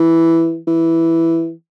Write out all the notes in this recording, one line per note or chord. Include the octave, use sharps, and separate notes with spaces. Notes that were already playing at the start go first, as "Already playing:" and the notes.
Already playing: E3
E3